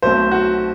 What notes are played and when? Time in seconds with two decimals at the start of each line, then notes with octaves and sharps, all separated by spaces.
0.02 B1 B2 A3 C4 C5
0.31 F#4